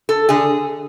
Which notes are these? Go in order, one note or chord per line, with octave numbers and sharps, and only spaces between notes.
A4
D3 G#4